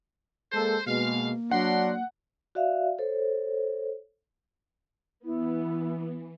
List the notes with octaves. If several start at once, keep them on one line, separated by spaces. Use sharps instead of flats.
G#3 A#3 A4 C5
B2 G#3 A#3 F5
F#3 D4 A#4 F#5 C6
F#4 D5 E5 F5
A4 C5 C#5
E3 B3 E4